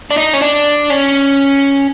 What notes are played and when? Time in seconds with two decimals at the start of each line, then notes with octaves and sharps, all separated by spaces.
0.11 D4
0.17 D#4
0.34 C#4
0.42 D4
0.90 C#4